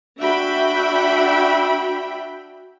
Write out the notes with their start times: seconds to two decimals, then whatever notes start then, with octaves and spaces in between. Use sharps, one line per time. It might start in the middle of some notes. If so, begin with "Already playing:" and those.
0.19 D4 F#4 E5 G5 B5